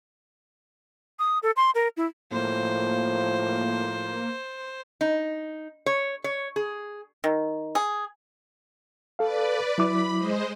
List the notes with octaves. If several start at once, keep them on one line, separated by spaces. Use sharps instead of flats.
D#6
A4
C6
A#4
E4
A2 F3 A#3 C5
D#4
C#5
C#5
G#4
D#3
G#4
A4 B4 D5 F5
F#3 E4 B5 D6
G#3 C5 D#5